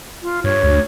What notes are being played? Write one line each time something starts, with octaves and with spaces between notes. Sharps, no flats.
F4
G2 C#5
D2